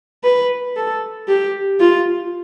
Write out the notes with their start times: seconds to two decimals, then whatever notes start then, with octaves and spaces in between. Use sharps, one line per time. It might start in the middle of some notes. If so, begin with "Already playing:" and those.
0.24 B4
0.76 A4
1.28 G4
1.80 F4